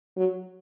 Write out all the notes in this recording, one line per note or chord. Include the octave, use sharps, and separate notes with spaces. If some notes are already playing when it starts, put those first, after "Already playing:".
F#3